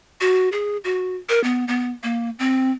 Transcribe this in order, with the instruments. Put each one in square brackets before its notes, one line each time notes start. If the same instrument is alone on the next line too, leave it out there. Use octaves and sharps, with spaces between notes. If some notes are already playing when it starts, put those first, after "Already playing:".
[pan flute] F#4
G#4
F#4
A#4
B3
B3
A#3
C4